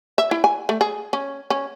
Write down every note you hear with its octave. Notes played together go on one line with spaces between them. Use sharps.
E5
E4
G#5
A3
G#4
C#4
C#4